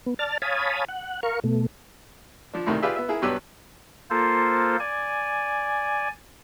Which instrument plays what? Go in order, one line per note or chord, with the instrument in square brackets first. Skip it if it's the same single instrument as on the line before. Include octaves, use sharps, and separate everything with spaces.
[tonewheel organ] B3
D5 A5 F6 A6
C#5 F5 G#5 A5 B5 D#6
F#5
A#4 F5 C#6
B2 A3
[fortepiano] F3 D4
D2 A2 C3 D#3
F4 G4 G#4 B4 D5 E5
B3 E5
E4 G#4 A#4
G2 B2 F#3 G4 B4 E6
[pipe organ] A#3 F4 A4 C5
D5 G#5